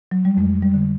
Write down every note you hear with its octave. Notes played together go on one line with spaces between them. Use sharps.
F#3
G3
F2 G#3
G3
D3